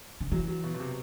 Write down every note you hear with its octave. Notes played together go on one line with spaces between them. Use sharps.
D3
E3 F#3
F#3
B2
B2
C3